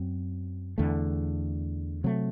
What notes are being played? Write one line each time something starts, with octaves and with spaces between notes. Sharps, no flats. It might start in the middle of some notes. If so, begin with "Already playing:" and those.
Already playing: F#2 F#3 C4
E2 D3 A3
C3 F#3 A3